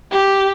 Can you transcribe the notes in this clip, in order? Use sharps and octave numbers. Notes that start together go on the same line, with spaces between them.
G4